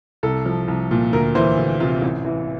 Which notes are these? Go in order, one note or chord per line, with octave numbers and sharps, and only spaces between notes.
C2 A4
F3
C2
A#2
D2 A#4
E3 C5
D2
C3 F4
A1
E3